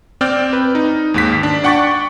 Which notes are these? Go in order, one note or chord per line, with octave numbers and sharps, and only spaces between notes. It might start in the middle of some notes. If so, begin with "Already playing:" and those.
C4 D5 G5 F6 G6
B4
D#4
D#2 G#2 B6
D4
D5 F#5 G5 C#6 D6 A6